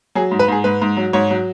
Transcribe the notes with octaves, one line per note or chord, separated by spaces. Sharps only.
F#3 G#4
G#2
B4
G#2 G#4
G#2 B4
G#2
F#3
G#2 C#5
F#3